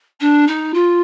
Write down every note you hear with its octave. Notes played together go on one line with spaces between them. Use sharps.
D4
D#4
F4